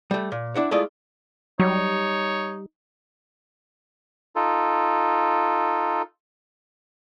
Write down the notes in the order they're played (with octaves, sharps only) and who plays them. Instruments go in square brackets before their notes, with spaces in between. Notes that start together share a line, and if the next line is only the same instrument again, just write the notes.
[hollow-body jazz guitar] G3 A3
A#2
D4 E4 F#5
G#3 A3 E4 F4 D5 D#5
[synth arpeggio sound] F#3 [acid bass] G3 [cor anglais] D#4 [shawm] C#5
[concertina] D#4 F4 A4